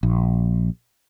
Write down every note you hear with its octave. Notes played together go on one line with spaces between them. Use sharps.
A#1